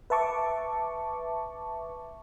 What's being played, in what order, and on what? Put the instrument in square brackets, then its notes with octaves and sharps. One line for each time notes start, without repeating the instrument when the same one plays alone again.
[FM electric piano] B4 E5 A5 C#6 D6